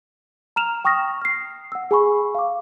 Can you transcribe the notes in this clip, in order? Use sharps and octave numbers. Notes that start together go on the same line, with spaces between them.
A#5 F6 E7 F7
G5 C#6 D#6 F6 A#6
F6 C7
F#5 E6
G#4 G#5 B5 C#6
F5 D6